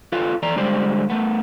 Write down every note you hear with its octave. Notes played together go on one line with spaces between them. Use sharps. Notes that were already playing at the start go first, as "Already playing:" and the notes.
F4 A4 B4 F5
E3 A4 D5 A#5
D3 G3 G#3 G4 C5 D5
A3 B3